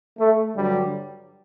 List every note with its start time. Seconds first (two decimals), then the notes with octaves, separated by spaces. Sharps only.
0.18 A3
0.56 G2 D3 F#3 G3